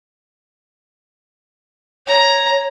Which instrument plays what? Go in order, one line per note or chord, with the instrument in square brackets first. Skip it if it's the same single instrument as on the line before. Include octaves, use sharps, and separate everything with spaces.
[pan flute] C#5 [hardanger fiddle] A#5